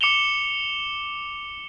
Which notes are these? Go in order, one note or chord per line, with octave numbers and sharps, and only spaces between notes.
D6 C#7 E7 F7 G7